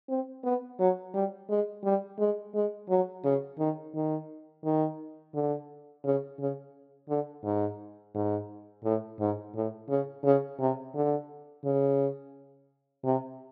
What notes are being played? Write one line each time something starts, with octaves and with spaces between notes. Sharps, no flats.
C4
B3
F#3
G3
G#3
G3
G#3
G#3
F#3
C#3
D#3
D#3
D#3
D3
C#3
C#3
D3
G#2
G#2
A2
G#2
A2
C#3
C#3
C3
D3
C#3
C3